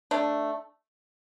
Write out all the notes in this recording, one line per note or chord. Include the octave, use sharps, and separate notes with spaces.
A3 D4